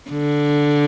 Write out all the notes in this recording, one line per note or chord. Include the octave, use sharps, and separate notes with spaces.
D3